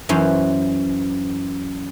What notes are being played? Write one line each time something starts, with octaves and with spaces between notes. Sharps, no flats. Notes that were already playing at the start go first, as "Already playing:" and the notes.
F#2 E3 C#4 C5